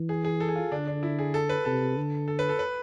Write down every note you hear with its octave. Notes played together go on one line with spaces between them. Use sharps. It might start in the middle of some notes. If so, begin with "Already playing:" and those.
Already playing: E3
G#4
G#4
A4
G#4
F4
D3 D4
D4
E4
G#4
A4
B4
C3 A4
D3
A4
B4
A4
B4